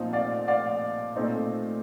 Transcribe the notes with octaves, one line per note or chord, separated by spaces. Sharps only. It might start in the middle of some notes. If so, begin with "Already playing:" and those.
Already playing: A#2 F3 C4 D#4
D5 F5
D5 F5
A#2 A3 C4 D#4